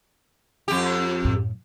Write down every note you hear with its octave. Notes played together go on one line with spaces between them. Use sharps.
F2 G4
F#2 A2